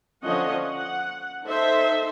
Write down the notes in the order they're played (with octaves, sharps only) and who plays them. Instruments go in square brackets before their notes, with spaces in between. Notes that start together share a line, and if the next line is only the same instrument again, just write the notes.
[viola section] D3 F3 C#4 D#5 F#5
F#5
D#4 A4 C5 E5